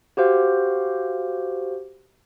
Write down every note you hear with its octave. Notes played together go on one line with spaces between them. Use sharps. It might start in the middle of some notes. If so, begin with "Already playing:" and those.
F#4 G4 C5 F5